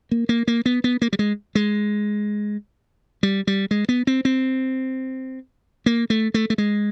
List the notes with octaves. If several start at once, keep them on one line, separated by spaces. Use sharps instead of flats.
A#3
A#3
A#3
B3
B3
A#3
G3
G#3
G#3
G3
G3
G#3
B3
C4
C4
A#3
A3
A3
A3
G#3